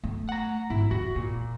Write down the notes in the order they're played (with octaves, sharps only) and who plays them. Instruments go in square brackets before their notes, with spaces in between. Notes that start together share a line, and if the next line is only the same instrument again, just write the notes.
[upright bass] A3
[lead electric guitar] F#5 A#5
[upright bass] G#1 [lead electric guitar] E4
[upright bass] E2 [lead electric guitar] F#4
[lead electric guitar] A#2 [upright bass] F4